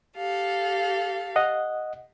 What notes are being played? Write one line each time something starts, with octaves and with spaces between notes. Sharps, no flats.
G4 A4 F5
D#5 F#5